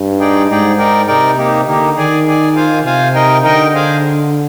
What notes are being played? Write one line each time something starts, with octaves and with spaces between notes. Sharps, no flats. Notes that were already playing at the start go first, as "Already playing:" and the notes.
Already playing: G2
D#4 G#4 D5 G5
G#2 D#4 G#4 D5 G5
D#4 A#4 D5 G5
C3 D#4 A#4 D5 G5
A#3 D#4 G4
D3 A#3 D#4 G4
D#3 G#4 D5 G#5
G#4 D5 G#5
F4 C5 F5 G#5
C3 F4 C5 F5 G#5
D#4 A#4 D#5 G5
D3 D#4 A#4 D#5 G5
G#4 C5 F5 G#5